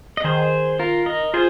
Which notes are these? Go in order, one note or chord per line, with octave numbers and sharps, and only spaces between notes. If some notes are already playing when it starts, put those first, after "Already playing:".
D#5
D#3 G#4 C5
F4 A#4
A#4 D#5
F4 G#4 C5